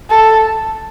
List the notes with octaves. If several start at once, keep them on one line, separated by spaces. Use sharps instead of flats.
A4